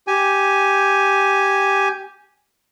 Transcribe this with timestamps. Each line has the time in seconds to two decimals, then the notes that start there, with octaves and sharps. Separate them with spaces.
0.07 G4 G#5